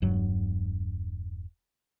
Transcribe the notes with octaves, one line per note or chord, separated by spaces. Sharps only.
E1 G2 F#3